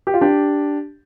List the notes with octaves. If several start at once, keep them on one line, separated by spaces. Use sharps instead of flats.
G4
F4
D4 G4